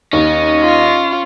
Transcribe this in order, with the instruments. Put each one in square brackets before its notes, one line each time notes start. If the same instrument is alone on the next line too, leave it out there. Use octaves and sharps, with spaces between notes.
[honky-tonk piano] D#2 [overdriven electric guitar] C#4 [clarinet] D#5
[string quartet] F4